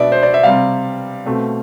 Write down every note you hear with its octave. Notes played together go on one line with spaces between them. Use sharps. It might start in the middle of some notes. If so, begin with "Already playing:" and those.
Already playing: B2 B3 D4 D5 E5
C5
D5
E5
C3 G3 C4 F5
B2 A3 C4